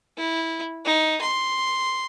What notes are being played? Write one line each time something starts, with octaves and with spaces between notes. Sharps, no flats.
E4
D#4
C6